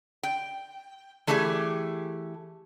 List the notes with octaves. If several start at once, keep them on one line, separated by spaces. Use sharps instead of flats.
G5
E3 A3 G4 G#4 C#5 G#5